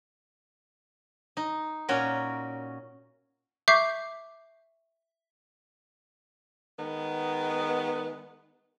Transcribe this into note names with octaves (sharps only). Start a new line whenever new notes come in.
D#4
A#2 C#4 F#4 A#4
E5 C#6 D6 G6 C7
D#3 G#3 B3